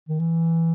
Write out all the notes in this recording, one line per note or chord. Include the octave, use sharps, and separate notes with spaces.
D#3
E3